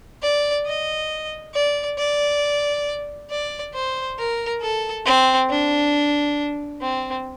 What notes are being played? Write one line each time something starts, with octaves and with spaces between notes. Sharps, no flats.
D5
D#5
D5
D5
D5
C5
A#4
A4
C4
D4
C4